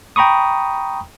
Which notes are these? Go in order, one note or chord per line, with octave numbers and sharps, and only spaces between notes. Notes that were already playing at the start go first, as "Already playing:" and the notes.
G5 A#5 B5 C#6 D#6